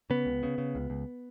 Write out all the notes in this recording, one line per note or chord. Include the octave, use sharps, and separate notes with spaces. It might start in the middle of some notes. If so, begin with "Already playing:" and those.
C#3 B3
C#2
C#3
C#3
C#2
C#2